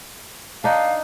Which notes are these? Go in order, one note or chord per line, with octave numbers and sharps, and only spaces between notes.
D4 D#4 F5